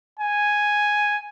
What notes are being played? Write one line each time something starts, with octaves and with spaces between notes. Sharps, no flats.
G#5